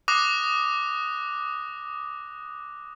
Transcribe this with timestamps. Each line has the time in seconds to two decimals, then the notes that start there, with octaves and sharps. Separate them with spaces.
0.08 D6 D#6 F#6 A#6